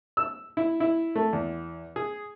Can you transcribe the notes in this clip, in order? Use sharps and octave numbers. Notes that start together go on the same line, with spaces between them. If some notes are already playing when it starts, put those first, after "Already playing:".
E6
E4
E4
A3
E2
G#4